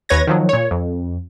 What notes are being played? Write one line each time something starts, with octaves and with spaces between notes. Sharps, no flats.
D#2 B4 C#5 G#6 A#6
D#3 F3 F#3
A#2 C#5
F2